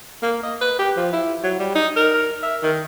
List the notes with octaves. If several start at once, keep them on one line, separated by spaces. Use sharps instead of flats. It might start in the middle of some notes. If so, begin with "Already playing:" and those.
A#3
D#5
B4
G4
F3
E4
F#3
G3
D#4
A#4
E5
D#3